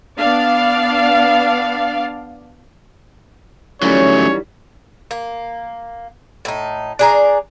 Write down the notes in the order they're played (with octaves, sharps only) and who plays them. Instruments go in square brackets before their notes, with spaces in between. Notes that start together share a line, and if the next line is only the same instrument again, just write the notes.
[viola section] B3 D4 D5 F5
[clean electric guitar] D#3 E3 G3 [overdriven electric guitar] F#3 A3 [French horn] C#4 [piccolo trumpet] C#5
[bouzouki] A#3
A2 D#4
D4 G#4 A#5